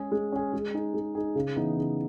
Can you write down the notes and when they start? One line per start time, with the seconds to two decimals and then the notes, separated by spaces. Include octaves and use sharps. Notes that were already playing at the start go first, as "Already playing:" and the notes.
Already playing: G#3 C#4 G#4
0.12 G#3
0.32 C#4 G#4
0.54 G#3
0.74 D#4 G#4
0.94 G#3
1.15 D#4 G#4
1.35 C#3
1.56 E3 B3 D#4
1.77 C#3